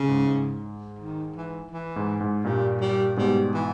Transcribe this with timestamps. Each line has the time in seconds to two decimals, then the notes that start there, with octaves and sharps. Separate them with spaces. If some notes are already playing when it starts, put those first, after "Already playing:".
Already playing: C#3
0.08 G#2
0.26 G#2
0.99 D#3
1.36 E3
1.72 E3
1.96 G#2
2.21 G#2
2.44 G2 A#2 G3
2.81 G3
3.17 G#2 B2 G3
3.54 E3